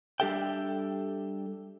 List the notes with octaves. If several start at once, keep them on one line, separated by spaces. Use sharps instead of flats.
G3 D4 G4 A4 E5 G5